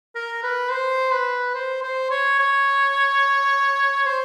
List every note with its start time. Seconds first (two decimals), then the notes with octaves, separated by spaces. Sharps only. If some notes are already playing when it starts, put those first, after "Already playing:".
0.15 A#4
0.43 B4
0.71 C5
1.13 B4
1.55 C5
1.83 C5
2.10 C#5
2.39 C#5
4.06 C5